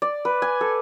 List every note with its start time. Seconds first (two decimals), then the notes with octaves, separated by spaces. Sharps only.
0.02 D5
0.25 B4
0.42 G#5
0.61 A4